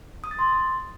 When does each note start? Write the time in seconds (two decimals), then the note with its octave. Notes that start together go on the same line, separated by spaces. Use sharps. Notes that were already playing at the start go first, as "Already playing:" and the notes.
0.24 D#6
0.31 A6
0.39 C6